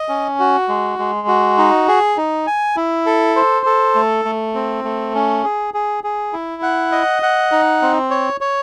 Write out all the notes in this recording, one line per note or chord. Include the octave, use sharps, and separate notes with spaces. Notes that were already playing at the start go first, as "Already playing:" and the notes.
Already playing: D#5
C#4
F#4
G#3
G#3
F#4
D#4
G#4
D#4
G#5
E4
A4
C5
A4
A3
A3
C4
A3
C#4
G#4
G#4
G#4
E4
F#5
D#5
F#5
D#4
C4
C#5
C#5